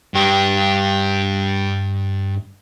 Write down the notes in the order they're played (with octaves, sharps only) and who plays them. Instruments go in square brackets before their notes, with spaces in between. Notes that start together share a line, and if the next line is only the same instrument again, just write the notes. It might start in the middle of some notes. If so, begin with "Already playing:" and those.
[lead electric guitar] G2 G4